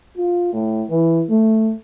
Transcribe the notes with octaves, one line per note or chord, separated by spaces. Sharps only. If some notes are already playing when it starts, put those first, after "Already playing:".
F4
A2
E3
A3